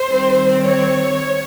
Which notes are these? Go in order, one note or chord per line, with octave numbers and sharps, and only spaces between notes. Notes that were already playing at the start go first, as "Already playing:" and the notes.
Already playing: C5
D#3 G3 C4
C#5